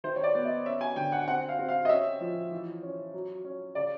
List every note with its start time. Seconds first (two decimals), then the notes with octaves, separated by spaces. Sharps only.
0.04 D#3 C5
0.16 C#5
0.23 D5
0.35 B3
0.45 D#5
0.65 C#4 E5
0.81 G#5
0.96 D3 G5
1.12 F#5
1.28 C4 F#5
1.49 F5
1.59 C4
1.69 F5
1.85 D#5
1.89 C#4 E5
2.20 F3
2.51 E3
2.83 C#4
3.13 F#3
3.45 C#4
3.75 C#3 D5